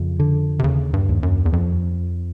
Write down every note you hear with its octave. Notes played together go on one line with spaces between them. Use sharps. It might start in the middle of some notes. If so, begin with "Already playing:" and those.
Already playing: F2 C#3
D3
C3
D#2 C#3
G2
D#2
F#2
E2
F2 F3